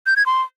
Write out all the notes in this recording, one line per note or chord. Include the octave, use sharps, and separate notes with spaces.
G6
G#6
C6